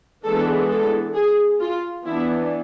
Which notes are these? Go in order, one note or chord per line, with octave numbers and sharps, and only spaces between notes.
E3 G#3 B3 D4 A4
A4
G#4
F4
E3 B3 D4 E4